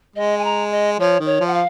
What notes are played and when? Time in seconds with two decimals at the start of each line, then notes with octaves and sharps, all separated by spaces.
0.16 G#3 D#5
0.38 G#5
0.44 A#5
0.71 D#5
0.99 F3 C#5
1.20 D#3
1.26 C#5
1.40 F3
1.47 F#5
1.54 F5